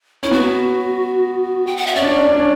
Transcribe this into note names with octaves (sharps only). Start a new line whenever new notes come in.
C#4 E4
B3 F#4
G5
F#5
E5
C#4 D5
D4
C#4
D4
C#4
D4
C#4